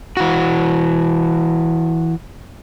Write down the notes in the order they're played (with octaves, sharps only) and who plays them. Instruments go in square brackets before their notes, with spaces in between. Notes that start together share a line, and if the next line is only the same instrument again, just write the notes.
[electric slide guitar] E3 F#4